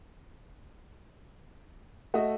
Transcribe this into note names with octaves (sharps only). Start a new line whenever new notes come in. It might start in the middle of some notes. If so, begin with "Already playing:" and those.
A3 F#4 D#5 E5